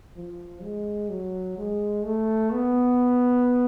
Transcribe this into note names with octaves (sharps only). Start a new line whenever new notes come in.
F3
G#3
F#3
G#3
A3
B3